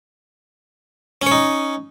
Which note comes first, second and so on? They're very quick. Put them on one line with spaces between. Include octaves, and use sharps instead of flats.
C#4 C#5 D#4